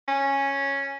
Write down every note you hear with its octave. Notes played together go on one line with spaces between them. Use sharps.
C#4